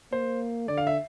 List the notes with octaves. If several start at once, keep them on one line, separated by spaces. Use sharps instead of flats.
A#3 C5
D3 D5
F5
E5